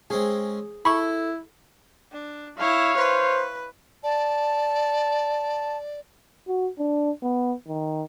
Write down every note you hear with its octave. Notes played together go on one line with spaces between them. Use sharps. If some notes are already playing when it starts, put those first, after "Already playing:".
G#3 C4 C#4 G#4
E4 A4 B5 C#6
D4
E4 C#5 F5
B4 C5
D5 A5
F#4
D4
B3
D#3